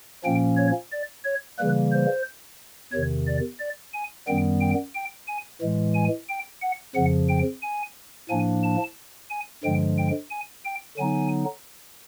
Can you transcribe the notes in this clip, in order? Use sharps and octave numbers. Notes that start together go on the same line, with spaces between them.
A#2 F3 A#3 C#4 G5
C#5
D5
C#5
C#3 E3 G3 A#3 B4
C5
E2 C3 D#3 C#5
D5
D5
G#5
F#2 D#3 G3 B3 G5
G5
G5
G#5
A2 E3 G#3
G#5
G5
F#5
F2 C#3 F3 F#5
G5
G#5
A2 F3 A#3 D4 G#5
A5
G#5
G2 D3 F3 G#3 G5
G5
G#5
G5
D3 F#3 B3 D#4 G#5